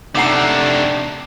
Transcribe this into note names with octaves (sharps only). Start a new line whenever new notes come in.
C3 A3 D4 D#4 F#5 A#5 D6 C7